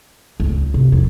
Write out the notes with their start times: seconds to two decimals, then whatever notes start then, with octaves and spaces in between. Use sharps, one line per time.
0.40 C#2
0.74 C3
0.92 E2 F3